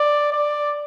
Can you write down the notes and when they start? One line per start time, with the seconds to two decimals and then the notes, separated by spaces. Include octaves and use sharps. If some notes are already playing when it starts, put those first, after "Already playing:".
Already playing: D5
0.33 D5